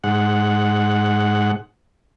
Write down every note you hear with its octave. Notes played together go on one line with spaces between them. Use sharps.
G#2 F#5